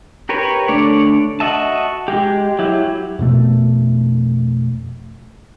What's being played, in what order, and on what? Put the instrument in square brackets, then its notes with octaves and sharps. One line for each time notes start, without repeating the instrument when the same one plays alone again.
[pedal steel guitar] G4 A#4 B4 C#5
D3 A3 D4 C#5 D5
F#4 D#5 E5 A5
G#3 G4
F#3 E4 G4
[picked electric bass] F2 B2 A3